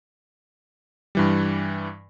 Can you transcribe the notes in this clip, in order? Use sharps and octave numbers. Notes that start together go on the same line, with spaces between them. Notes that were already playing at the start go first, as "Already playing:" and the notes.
G2 E3 G3